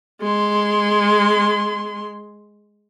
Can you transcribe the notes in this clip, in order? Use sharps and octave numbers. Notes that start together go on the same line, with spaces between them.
G#3 C6